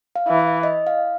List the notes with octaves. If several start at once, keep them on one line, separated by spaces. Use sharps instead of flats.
F5
E3
E5
D#5
F5